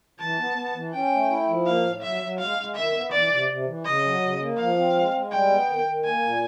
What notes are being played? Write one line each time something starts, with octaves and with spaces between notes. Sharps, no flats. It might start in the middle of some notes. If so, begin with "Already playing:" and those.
E3 A5
B3
B3
E3
C#4 G5
A3
E4
F3
A#3 F5
A2
F#3 E5
F#3
G#3 F5
G#3
D#3 E5
B3
E3 D5
C3
C3
E3
C#3 D#5
F#3
C#3
A#3
F3 F5
C4
G#3
G#3
G3 G5
B3
D#3
D#3
A#3 G#5
A#2